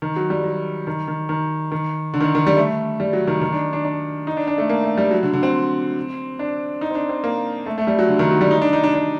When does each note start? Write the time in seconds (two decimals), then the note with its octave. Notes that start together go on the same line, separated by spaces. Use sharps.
0.02 D#3
0.16 F#3
0.30 G3
0.44 F#3
0.87 D#3
1.08 D#3
1.29 D#3
1.72 D#3
2.14 D3
2.21 D#3
2.25 D3
2.35 D#3
2.47 G3
2.57 A3
3.00 G3
3.13 F#3
3.27 D#3
3.41 D#3
3.52 D4
3.73 D4
3.85 D4
4.27 D#4
4.37 D4
4.47 D4
4.58 A3
4.69 A#3
4.84 A3
4.97 G3
5.11 F#3
5.23 D3
5.33 D3
5.43 C4
6.39 D4
6.81 D#4
6.91 C4
6.95 D4
7.09 C4
7.24 A#3
7.66 A3
7.78 A3
7.87 G3
7.99 F#3
8.08 D3
8.19 D#3
8.31 F#3
8.41 G3
8.51 D#4
8.62 D4
8.73 D#4
8.84 D4
8.94 D4